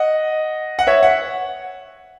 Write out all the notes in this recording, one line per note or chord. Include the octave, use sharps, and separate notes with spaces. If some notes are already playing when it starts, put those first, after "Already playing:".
Already playing: D#5 F#5
F#5
C#5 E5
F#5